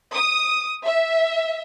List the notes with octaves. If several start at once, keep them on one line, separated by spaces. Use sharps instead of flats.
D#6
E5